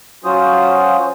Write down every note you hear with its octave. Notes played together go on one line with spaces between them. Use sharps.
F#3 C#4 F4 F#4 C5 D#6